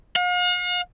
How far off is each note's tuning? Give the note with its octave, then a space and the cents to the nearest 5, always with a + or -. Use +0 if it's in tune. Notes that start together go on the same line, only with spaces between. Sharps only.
F5 +45